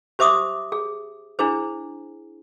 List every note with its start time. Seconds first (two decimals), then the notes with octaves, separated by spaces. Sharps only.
0.19 G4 C5 E5 D6 D#6
0.72 G#4
1.39 D4 E4 G#4 C5